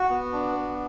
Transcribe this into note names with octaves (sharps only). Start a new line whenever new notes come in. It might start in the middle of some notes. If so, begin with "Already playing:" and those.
Already playing: F#4
B3
D4
B3